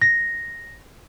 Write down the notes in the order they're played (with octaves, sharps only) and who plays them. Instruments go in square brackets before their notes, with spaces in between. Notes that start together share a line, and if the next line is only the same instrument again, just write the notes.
[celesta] A#6